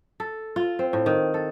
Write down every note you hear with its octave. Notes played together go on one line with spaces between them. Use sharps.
A4
F4
C4
A2
D#3
A4